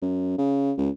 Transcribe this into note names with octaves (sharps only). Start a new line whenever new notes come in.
F#2
C#3
C#2